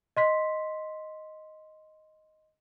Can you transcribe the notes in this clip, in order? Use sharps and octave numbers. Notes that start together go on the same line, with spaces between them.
D#5 C6 B6